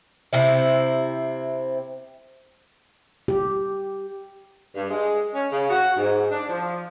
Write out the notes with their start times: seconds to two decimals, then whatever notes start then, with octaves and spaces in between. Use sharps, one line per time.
0.33 C3 C4 E4
3.28 G4
4.75 G2
4.90 G#3
5.34 C#4
5.51 C#3
5.70 F#4
5.97 G#2
6.31 D4
6.49 F3